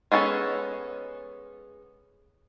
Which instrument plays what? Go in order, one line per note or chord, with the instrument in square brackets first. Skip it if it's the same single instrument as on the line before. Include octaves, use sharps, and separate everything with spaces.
[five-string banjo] G#3 B3 C#4 A4